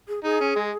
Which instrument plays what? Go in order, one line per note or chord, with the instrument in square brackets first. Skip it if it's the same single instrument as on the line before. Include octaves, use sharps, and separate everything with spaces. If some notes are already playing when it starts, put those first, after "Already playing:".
[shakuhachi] G#4
[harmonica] D#4 [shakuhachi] G#4
[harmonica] C#4
G#3